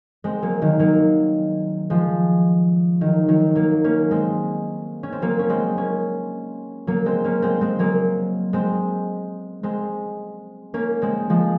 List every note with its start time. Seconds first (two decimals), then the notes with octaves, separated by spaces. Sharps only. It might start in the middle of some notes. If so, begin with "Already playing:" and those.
0.24 G#3 C4
0.42 F#3 A#3
0.62 D#3 F#3
0.79 F#3 A#3
1.90 F3 G#3
3.01 D#3 F#3
3.28 D#3 F#3
3.55 F#3 A#3
3.84 A#3 C#4
4.11 G#3 C4
5.03 C#4
5.12 C4
5.22 F#3 A#3
5.39 C#4
5.50 G#3 C4
5.77 A#3 C#4
6.87 F#3 A#3
7.06 G#3 C4
7.24 A#3 C#4
7.42 G#3 C4
7.61 G#3 C4
7.79 F#3 A#3
8.53 G#3 C4
9.63 G#3 C4
10.74 A#3 C#4
11.02 G#3 C4
11.30 F3 G#3